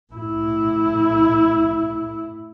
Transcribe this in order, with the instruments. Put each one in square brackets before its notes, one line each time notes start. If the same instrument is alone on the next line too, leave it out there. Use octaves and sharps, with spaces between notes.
[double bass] A2 E4